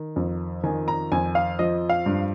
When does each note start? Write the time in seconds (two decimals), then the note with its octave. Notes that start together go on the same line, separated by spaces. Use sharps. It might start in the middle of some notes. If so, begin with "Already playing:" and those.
Already playing: D#3
0.16 F2
0.63 D#3 G#5
0.88 A#5
1.12 F2 G#5
1.35 F5
1.59 F3 D#5
1.89 F5
2.06 G2